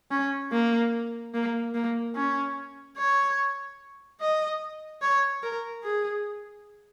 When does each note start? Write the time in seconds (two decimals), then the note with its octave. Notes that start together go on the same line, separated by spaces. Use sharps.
0.11 C#4
0.52 A#3
1.34 A#3
1.74 A#3
2.16 C#4
2.97 C#5
4.21 D#5
5.02 C#5
5.43 A#4
5.84 G#4